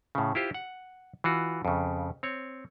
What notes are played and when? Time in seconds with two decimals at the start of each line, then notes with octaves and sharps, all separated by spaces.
0.15 A2 C#3
0.35 E4 F4 G4 C5
0.54 F#5
1.24 E3 F4 F#4
1.65 F2 C#3
2.23 C4 C#5